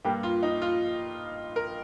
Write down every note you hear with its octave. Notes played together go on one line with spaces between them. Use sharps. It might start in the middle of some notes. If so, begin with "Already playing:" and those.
G2 G3 A#3 G4
F4
D#4
F4
A#4